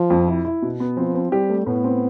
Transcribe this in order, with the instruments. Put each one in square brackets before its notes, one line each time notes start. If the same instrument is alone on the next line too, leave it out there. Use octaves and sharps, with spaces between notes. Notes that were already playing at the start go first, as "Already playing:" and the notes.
Already playing: [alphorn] F3
[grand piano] F2
E4
E4
B2
B3
[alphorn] F3 [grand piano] C4
[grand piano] C4
[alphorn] G3 [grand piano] G4
[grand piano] A3
[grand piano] A2 [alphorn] B3
[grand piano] C4